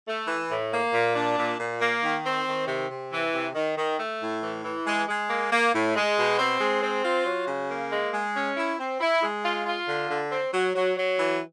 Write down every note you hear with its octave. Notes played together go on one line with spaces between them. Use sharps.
A3
E3
A2
A#3
A#2
D4
A#2
A#2
A#3
D#3
C4
D#3
C3
C3
E3
C3
D#3
D#3
A3
A2
E3
E3
G#3
G#3
A#3
A#3
A2
G#3
B2
C4
G#3
C4
F4
F#3
C#3
A#3
G#3
G#3
C#4
E4
C4
E4
G#3
F4
F4
D3
D3
C4
F#3
F#3
F#3
E3